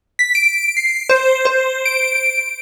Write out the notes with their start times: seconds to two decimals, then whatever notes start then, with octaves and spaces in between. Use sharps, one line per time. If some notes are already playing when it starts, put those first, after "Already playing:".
0.19 B6
0.35 D7
0.77 C7
1.09 C5
1.45 C5
1.85 D7